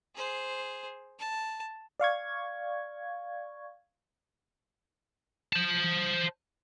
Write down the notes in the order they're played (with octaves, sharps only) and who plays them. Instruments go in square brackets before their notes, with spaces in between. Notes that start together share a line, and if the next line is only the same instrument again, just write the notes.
[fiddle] G#4 C5
A5
[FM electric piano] D5 F5 C#6 G#6
[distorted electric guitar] C5 A5